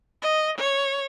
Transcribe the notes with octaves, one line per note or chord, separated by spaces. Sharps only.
D#5
C#5